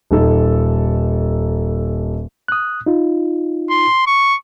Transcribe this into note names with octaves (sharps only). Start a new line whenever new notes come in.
D#1 D#4 A4
D#6 F#6
D#4 F4
C6
C#6